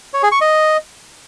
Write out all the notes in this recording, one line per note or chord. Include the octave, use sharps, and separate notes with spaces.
C#5
G#4
C#6
D#5